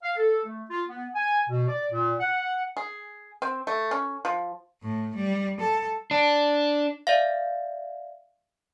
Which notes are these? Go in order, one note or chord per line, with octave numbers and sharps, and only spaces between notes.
F5
A4
A3
F4
B3
G#5
B2
D5
A#2
F#5
G#4
C4
A3
C#4
F3
A2
G3
A4
D4
D5 E5 F5